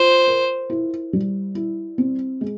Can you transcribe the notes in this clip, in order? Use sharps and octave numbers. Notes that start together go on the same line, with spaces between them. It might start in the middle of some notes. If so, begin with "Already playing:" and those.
Already playing: F4 C5
A#4
E4
G3
E4
C4
G#3